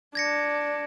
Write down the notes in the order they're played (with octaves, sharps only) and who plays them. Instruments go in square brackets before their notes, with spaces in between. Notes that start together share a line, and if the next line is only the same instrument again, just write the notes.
[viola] D4 [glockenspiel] G#6 A#6 C#7